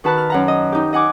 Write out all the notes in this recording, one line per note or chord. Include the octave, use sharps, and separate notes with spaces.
D#3 F#4 B4 A5 B5 F#6
F6
F#2 F#5 A#5
D#5
D#4 G4
D#5 F#5 G#5 D6